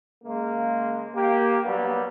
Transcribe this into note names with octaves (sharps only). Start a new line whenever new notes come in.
C#3 G#3 A#3
A#3 G4
G2 F#3 G3 A#3 B3